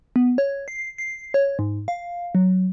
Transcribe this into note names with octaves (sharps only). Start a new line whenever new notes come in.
B3
C#5
C7
C7
C#5
G#2
F5
F#3